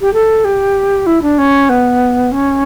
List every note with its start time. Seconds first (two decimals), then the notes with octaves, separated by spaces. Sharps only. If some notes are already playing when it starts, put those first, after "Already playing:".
0.01 G4
0.14 A4
0.45 G4
1.06 E4
1.22 D4
1.38 C#4
1.69 B3
2.32 C#4